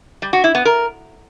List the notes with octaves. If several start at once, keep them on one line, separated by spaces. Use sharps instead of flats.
G3
F#4
E4
B3
A#4